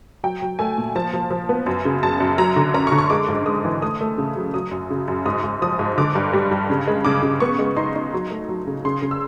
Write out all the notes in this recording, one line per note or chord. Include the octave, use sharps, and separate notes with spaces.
F#3 G5
F#3
A3 G#5
A#2
F3 A5
F3
F3
B3
F#2
C#3
F#2 A5
F#2
F#3 A#5
D3
C#4 A#5
C#6
D3
C#6
G#3 D6
G#2
G#3 D#6
E3
A3 D#6
A3
C#3
F#3
F#3 D#6
F#2
C#3
F#2
G#2 D#6
G#2
F3 D#6
G#2
D3 D6
G2
G3
G2
C#3
G#3
C#3 D6
C#3
B3 C#6
G#3
D#4 C6
D#4
F#3
A3
F#3
C#3
C#3 C6
C#3
E6